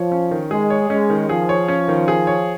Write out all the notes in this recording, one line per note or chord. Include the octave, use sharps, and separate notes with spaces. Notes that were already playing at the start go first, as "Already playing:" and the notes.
Already playing: F3 C#5
C#4
D#3
G#3 G#4
C#5
G#3 C#4
D#3
F3 G#4
C#5
C#4
D#3
G#4
C#5